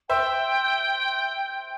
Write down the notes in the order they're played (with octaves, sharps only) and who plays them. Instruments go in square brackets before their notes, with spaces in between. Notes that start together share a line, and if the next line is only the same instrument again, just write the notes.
[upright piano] C5 E5 [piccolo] G5